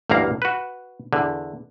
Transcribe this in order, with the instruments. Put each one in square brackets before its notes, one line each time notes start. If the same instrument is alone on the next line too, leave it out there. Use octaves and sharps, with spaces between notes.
[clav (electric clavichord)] A1 D2 G2 A#3 F5 A#5
F#4 B4
E2 D3